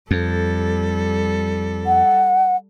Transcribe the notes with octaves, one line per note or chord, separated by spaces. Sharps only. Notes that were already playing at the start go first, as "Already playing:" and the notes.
F2 G3 A4
F#5